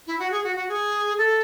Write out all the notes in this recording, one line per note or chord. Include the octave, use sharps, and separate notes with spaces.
E4
F#4
G#4
F#4
F#4
G#4
A4